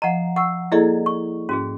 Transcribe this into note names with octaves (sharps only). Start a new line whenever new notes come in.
F3 D#5 F#5 A#5
F#5 C#6 E6
A#3 E4 G#4 A4 D5 D#5
C#6
G#2 C#4 F#4 G#4